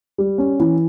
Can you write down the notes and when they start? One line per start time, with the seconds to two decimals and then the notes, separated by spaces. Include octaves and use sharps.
0.18 G3
0.38 C#4
0.60 E3